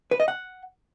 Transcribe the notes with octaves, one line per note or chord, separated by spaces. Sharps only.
B4
D#5
F#5